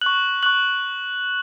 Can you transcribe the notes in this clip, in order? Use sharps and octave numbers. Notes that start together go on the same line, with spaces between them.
C#6 F#6 F#7
C#6 F#6 F#7